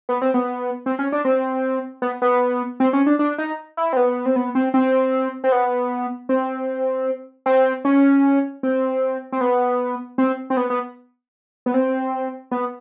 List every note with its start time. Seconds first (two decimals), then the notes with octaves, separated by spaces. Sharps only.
0.09 B3
0.21 C4
0.34 B3
0.86 C4
0.99 C#4
1.12 D4
1.25 C4
2.02 B3
2.22 B3
2.80 C4
2.93 C#4
3.06 D4
3.19 D4
3.38 D#4
3.77 E4
3.93 C4
3.97 B3
4.26 C4
4.36 B3
4.55 C4
4.74 C4
5.44 C4
5.52 B3
6.29 C4
7.46 C4
7.85 C#4
8.63 C4
9.32 C4
9.41 B3
10.18 C4
10.50 C4
10.57 B3
10.70 B3
11.66 B3
11.74 C4
12.51 B3